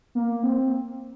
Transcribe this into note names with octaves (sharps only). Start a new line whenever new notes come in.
A#3
C4